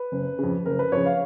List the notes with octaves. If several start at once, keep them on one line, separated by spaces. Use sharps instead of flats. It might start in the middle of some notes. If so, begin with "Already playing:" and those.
Already playing: B4
F#1
F2 C#3
F#1 A#4
B4
F2 C#3 C#5
F5